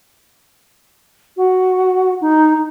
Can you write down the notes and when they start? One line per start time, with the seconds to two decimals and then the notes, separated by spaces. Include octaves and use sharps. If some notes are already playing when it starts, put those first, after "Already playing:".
1.37 F#4
2.21 D#4